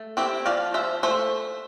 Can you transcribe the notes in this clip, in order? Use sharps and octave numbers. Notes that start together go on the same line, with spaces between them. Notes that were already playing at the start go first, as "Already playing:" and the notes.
Already playing: A3
C4 E4 G4
F3 D5 F5
F3 C5 E5
A3 C5 E5